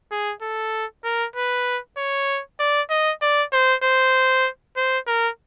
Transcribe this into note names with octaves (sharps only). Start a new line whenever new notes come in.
G#4
A4
A#4
B4
C#5
D5
D#5
D5
C5
C5
C5
A#4